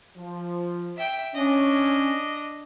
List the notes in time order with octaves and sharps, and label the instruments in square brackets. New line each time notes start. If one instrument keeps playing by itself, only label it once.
[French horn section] F3
[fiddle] E5 G5
[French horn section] C#4 [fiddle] D4 D#5